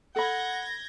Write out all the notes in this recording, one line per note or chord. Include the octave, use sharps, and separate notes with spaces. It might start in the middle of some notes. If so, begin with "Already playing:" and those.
A4 F#5 B5 G6 G#6 A#6